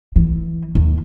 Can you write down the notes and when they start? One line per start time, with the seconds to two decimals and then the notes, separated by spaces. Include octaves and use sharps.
0.16 E3
0.75 D#2